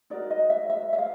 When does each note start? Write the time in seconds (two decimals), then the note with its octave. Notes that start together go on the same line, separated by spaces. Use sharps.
0.10 D#4 F#4 A#4 D5
0.30 D#5
0.50 E5
0.69 E5
0.93 E5
0.98 F5